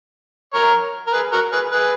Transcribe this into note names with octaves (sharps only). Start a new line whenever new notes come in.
A#4 C#5
A#4
G#4 B4
F#4 A#4
G#4 B4
G#4 B4